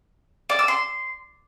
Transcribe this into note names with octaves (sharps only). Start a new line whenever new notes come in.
D5
E6
C6